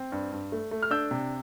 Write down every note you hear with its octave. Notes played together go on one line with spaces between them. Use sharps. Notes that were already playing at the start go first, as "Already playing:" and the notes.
Already playing: C4
G2
G2
A3
A3
F6
D4 E6 G6
C3